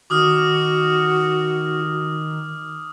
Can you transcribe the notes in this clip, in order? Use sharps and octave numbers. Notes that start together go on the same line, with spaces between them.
D#3 F#4 D6 D#6 F6